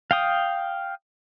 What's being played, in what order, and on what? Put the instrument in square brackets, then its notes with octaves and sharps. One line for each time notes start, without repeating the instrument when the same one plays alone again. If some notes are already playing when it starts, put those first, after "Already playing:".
[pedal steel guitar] F5 G5 D#6